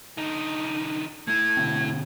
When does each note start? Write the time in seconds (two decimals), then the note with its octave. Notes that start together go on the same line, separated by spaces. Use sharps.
0.17 D3 D#4
1.27 A3 E4 G#6
1.57 B2 D3 C4